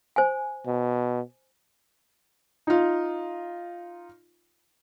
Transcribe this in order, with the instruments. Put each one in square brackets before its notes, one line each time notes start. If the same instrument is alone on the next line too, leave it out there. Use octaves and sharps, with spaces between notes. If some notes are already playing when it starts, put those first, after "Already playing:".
[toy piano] C5 G#5
[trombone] B2
[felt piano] D#4 F4